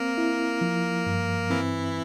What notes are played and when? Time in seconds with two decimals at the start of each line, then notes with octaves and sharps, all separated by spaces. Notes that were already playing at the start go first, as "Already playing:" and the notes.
Already playing: A#3 C4 A#4
0.18 E4
0.61 F3
1.06 G2
1.50 E3 C4 E4